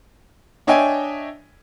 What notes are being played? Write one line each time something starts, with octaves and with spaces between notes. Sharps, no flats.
D4 C#5 D#5 E5 G5 G#5